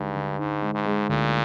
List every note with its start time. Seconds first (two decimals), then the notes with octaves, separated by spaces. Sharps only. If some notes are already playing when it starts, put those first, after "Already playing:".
Already playing: D2 G2 D3 G#3 D#4
0.15 D3
0.39 G#2 D#4
0.62 G#3
0.74 G#2
0.85 G#3
1.09 D2 A#2